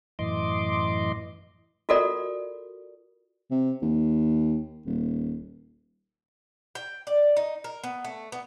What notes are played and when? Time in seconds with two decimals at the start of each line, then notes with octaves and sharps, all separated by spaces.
0.19 F#2 A2 E3 D#5 C6 D6
1.89 F4 F#4 A4 A#4 D5
3.51 C3
3.82 D#2
4.86 D#1
6.75 G5
7.07 D5
7.36 D#4
7.64 A#4
7.83 B3
8.04 A3
8.32 B3